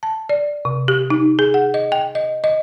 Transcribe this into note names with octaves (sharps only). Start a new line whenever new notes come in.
A5
D5
C3
G4
D#4
G#4
F#5
D#5
G5
D#5
D#5